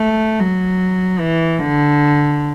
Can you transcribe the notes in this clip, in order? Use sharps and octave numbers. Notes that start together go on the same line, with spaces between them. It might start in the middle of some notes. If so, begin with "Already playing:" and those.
Already playing: A3
F#3
E3
D3